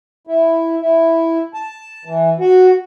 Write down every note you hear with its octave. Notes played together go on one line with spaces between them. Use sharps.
E4
E4
A5
E3
F#4